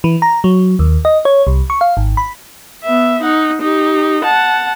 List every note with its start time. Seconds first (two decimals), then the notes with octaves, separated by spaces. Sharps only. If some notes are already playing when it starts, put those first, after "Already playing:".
0.04 E3
0.22 A#5
0.44 F#3
0.79 D#2
1.05 D#5
1.25 C#5
1.47 C2
1.70 C#6
1.81 F5
1.97 G#1
2.17 B5
2.84 B3 E5
3.22 D#4 F#5
3.62 D#4 G4
4.24 F#5 A5